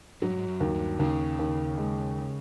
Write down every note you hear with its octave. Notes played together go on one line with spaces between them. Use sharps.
G#2 F#3
G2
G#2
F#2
D#2
G2
D#2 C#3
D#2
G#3